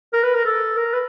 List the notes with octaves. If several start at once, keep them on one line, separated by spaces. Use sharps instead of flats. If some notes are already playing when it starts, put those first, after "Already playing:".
A#4
B4
A#4
A4
A#4
B4